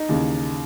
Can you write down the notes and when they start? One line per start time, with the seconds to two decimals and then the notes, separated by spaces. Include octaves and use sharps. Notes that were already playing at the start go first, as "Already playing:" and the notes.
Already playing: D#4
0.09 D#2 C#3 E3